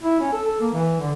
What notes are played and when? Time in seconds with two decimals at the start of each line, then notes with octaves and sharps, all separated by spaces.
0.03 E4
0.20 C#4
0.33 A4
0.46 A4
0.60 A#3
0.73 E3
1.00 D3